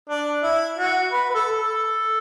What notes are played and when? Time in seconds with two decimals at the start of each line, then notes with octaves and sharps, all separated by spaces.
0.10 D4
0.43 E4
0.78 F#4
1.12 B4
1.30 B4
1.35 A4
1.58 A4